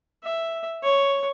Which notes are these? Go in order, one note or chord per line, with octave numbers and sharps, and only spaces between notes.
E5
C#5